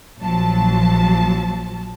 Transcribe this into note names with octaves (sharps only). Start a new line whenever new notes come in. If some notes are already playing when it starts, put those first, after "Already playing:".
A#1 F3 F#3 A5